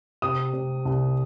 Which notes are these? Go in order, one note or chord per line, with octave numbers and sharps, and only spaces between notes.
C3 D#6
C3
C2